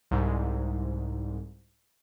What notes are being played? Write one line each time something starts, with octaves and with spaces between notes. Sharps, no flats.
C2 G#2